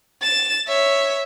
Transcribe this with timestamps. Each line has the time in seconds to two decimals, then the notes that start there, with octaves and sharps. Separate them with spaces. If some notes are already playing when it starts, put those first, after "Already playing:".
0.22 A6 E7
0.68 C#5 E5